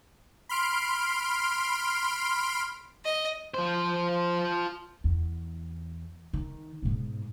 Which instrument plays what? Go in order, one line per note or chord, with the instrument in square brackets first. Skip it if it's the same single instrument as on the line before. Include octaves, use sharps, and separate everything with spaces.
[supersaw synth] B5 C6 F6 D7
[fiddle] D#5
[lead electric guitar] F3 C5
[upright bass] E2
D#3
G#2 B2